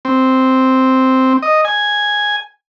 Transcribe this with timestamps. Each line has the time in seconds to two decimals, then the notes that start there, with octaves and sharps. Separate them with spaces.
0.05 C4
1.42 D#5
1.65 G#5